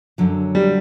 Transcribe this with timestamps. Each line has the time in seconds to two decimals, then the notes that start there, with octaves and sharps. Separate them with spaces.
0.18 F#2 D3 F#3
0.55 G3